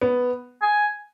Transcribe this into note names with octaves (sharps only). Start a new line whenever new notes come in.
B3
G#5